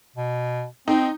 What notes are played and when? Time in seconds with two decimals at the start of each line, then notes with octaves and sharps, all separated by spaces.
0.16 B2
0.88 C4 D#4